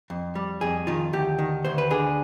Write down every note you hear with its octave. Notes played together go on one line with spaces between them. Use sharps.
F2
G3
F2 G#4
D#3 F4
D2 G4
D#3
D2 C5
B4
D3 G#4